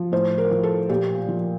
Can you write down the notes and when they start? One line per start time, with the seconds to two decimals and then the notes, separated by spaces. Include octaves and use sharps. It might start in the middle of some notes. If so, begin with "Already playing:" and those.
Already playing: F3
0.12 A2 C5
0.38 A#4
0.51 F3
0.63 A4
0.89 A#2 G4
1.28 F3